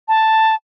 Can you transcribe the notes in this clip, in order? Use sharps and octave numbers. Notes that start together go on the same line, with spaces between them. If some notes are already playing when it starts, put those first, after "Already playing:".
A5